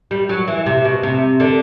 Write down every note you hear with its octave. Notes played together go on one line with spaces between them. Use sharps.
G3
F#3
E3
C3
B2
C3
D3